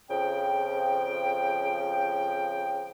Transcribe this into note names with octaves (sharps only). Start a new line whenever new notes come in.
F2 C#3 F3 G5